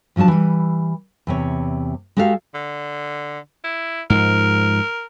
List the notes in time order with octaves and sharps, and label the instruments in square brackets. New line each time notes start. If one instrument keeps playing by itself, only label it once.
[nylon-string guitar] G#2 F3 F#3 D4 A5
E3 G3
E2 C3 C#5
G#3 F#4 G4 A4 F5
[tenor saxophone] D3
E4
[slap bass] G#2 F3 [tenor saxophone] A#4